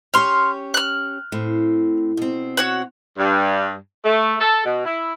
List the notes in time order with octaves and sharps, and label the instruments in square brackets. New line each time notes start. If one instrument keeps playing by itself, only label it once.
[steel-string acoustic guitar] C#4 G4 C#5 [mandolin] C6 F6
[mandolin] F6 F#6
[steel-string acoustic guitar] A2 C4
B2 C4
[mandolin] F#4 C#5 F#5
[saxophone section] G2
A3
A4
B2
E4